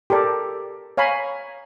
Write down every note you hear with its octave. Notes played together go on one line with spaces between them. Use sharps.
G4 A4 A#4 D5
C#5 F5 G#5 A#5 B5